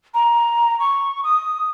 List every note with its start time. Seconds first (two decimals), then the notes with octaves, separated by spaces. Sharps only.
0.14 A#5
0.80 C#6
1.24 D#6